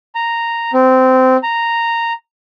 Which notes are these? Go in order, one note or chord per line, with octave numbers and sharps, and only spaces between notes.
A#5
C4
A#5